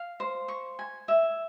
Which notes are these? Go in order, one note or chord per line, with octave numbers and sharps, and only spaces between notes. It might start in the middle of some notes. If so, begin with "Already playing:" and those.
Already playing: F5
C5
C#6
G#5
E5